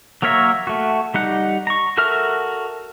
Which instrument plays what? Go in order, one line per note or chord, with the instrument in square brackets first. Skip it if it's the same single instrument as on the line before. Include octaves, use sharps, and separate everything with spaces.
[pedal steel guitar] F#3 A#3 A#4 C#5 E5
A3 F#4
G3 D#4 F#5
A#5 C#6
F#4 A4 A#4 E5 F6